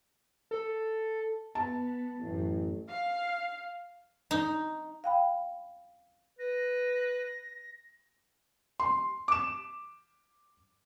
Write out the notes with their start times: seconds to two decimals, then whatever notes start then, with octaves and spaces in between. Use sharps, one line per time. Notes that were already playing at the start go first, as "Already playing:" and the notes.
0.51 A4
1.55 B3 A5
2.20 A1 F#2
2.89 F5
4.31 D#4
5.04 F5 G5 B5
6.39 B4 A#6
8.80 C6
9.28 D6 E7